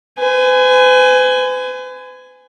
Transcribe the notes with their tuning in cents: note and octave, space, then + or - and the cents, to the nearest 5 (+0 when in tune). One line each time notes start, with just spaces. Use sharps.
B4 +45 G#5 +0